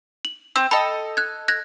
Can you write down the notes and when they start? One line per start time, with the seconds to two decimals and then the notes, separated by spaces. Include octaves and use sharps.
0.25 F#7
0.56 C4 E6
0.71 A4 D#5 G5 B5
1.17 F#6 G#6
1.48 F#6 G#6 A#6